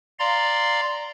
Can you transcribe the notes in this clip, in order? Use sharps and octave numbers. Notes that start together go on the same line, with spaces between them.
D5 F5 A#5 C6